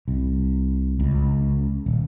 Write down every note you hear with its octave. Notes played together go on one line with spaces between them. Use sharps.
C2
C#2
D#1